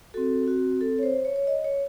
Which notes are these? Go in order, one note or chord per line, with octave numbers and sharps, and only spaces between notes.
C4 F#4 A4
F#4
A4
C#5
C5
C#5
C#5
D#5
C#5